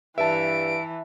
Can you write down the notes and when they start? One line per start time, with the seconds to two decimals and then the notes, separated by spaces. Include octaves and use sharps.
0.18 G2 E3 E5 A5 D7